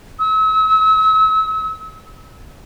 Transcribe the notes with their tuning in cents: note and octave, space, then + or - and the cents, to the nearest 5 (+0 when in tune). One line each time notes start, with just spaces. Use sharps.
E6 -40